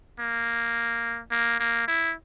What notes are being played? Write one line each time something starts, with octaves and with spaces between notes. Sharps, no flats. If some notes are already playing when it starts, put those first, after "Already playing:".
A#3
A#3
A#3
E4